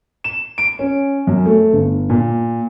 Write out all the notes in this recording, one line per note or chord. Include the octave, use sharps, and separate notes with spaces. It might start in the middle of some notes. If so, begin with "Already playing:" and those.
E7
D7
C#4
F#2
A3
G1
A#2